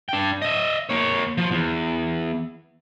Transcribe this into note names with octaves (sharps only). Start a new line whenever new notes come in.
D4 G5
D#5 E5
A#3 C#5
F3
E2